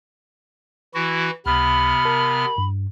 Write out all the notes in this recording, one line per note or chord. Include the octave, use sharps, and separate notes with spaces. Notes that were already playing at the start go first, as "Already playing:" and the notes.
E3 E4 F#4
C#2 C3 B3 B5 F6
A#4 A5
G2